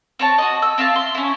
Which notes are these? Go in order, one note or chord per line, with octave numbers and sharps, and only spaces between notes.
C4 C#5 A5
F#4 D#5
E6
C4 E4 F5 A5
C6
C#4 E4